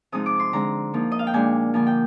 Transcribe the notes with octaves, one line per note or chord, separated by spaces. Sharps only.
C3 F3 G#3 C4 D#4 D#6
D6
C6
D3 G#3 C4 A#5
F3 A#3 D#4
D#5
F5
G5
A#2 G#3 D4 G#5
D3 F3 A#3 G#5
G5